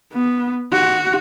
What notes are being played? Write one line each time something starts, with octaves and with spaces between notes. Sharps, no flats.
B3
F#4